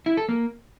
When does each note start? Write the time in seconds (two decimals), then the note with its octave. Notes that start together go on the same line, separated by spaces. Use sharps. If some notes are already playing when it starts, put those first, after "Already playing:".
0.06 E4
0.17 A4
0.29 A#3